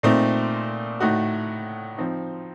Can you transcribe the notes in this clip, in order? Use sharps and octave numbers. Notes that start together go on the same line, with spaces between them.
A#2 A3 C4 D#4
A2 A3 D#4 F#4
F3 C4 D#4